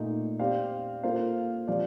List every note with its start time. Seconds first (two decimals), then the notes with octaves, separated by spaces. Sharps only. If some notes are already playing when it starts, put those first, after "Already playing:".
Already playing: A#2 A3 D#4
0.39 C4 G4 D5 F5
1.03 A#3 F4 A4 C5 F5
1.68 F3 C4 G4 D5 F5